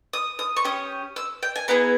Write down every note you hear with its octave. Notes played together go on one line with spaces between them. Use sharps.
D#6
D#6
C#6
C#4 G4 D#6
E6
G5
G#5
B3 E4 G#4 A#5